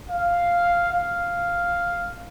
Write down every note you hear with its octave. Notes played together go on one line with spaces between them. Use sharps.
F5
F5